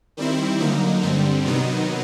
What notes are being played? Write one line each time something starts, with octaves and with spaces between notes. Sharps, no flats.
D#3 G3 C4 E4
D3 F#3 A#3 D#4
G2 D3 G3 C4
C3 D#3 F#3 B3 D#4